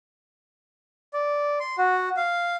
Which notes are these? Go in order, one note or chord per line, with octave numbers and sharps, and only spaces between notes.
D5
C6
F#4
F5